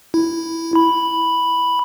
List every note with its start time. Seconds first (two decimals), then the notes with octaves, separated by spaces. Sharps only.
0.14 E4
0.75 B5